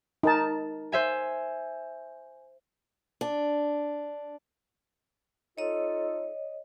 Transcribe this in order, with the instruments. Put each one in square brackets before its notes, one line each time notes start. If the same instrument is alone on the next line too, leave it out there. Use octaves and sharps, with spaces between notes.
[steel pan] D#4 A#4 A5
[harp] C5 E5 G#5
[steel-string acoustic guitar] D4
[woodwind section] D#4 F4 A4 [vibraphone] C#5 D#5